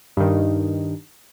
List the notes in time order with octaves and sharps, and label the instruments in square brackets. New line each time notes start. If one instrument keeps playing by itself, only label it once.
[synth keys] G2 D#3